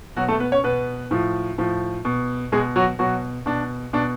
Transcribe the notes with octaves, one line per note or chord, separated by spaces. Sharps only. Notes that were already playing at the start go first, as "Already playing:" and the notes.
B2 F#3 F#4
A3 A4
B3 B4
C#4 C#5
B2 B3 B4
A2 F3
A2 F3
B2
B2 G#3 G#4
F#3 F#4
B2 F#3 F#4
B2 D4
B2 D4